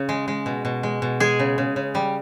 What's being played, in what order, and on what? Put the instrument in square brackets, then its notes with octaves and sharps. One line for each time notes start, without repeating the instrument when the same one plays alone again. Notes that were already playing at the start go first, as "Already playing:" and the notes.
Already playing: [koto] C#3
G#3
G#3
B2
B2
G#3
B2
G#3 G#4
C#3
C#3
C#3
G3